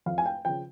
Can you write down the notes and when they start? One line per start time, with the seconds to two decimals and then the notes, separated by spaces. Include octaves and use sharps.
0.06 F2 F5
0.18 G#5
0.26 G5
0.45 C#3 F3 G5